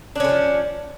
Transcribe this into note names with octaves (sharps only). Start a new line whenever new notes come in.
D3 F3 C#4 D4